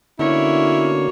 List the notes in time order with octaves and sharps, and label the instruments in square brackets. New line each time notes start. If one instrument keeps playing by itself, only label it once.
[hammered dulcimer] B2 [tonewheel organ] D3 C#4 [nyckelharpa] A#3 C#5 [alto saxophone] E4